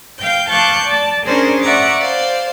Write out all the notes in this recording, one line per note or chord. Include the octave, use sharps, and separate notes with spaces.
F5 G5 G6
F5 A5 C#6 D6 F#6 G6
D5 A5
C#4 D4 G#4 A#4 C5 D5
D5 E5 F#5 A#5 C#6 D6
C5 D5 F5